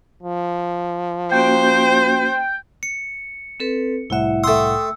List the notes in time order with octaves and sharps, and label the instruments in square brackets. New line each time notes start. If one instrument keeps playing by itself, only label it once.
[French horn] F3
[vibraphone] A#3 C#4 F#4 [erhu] C5 [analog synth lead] G5
[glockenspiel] C#7
[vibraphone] C4 A4 B4
[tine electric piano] C2 A2 F#5 [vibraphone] E4 E5
[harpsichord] A3 C6 [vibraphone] E5 G5 D#6 [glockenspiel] E6